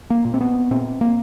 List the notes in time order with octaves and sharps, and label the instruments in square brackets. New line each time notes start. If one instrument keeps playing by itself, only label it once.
[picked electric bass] A#3
A#2
C4
B3
A#2 C4
A#3